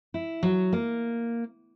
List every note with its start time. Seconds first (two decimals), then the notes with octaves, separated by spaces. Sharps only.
0.14 E4
0.43 F#3
0.73 A#3